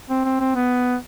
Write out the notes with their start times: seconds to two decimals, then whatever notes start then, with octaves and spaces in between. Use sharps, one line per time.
0.10 C4
0.25 C4
0.40 C4
0.55 B3